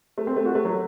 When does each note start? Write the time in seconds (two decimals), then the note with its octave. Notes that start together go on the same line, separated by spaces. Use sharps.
0.18 A3
0.27 C4
0.36 A3
0.46 F#4
0.55 A3
0.65 F#3